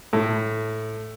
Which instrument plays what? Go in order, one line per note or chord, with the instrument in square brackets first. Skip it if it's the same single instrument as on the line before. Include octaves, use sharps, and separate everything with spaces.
[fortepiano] A2